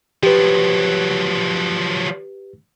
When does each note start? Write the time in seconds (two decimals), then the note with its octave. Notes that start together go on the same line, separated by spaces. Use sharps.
0.23 F3 F#3 G4 B4